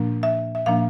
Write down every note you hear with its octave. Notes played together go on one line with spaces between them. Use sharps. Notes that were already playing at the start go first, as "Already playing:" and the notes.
Already playing: A#2 F3 A#3 D4
E5
E5
A#2 F3 A#3 D4 F5